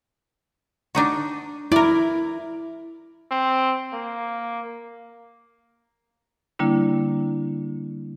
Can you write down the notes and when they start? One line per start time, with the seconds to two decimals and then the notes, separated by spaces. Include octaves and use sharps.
0.95 D4 D#4 F#4
1.72 E4 A#4 D5
3.31 C4
3.93 A#3
6.59 D3 G3 A#3 D4 E4